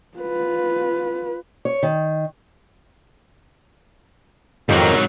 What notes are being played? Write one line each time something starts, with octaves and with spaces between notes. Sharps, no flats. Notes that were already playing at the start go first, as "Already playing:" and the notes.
F4 B4
C#5
D#3
F2 G#2 D#3 F#3 G4 A#4